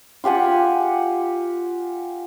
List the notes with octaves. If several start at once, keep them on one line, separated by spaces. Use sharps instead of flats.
F4 G4 F#5 G#5